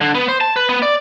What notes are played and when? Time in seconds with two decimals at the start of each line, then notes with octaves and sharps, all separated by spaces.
0.01 D3
0.15 B3
0.28 C5
0.41 A5
0.56 B4
0.69 B3
0.82 D5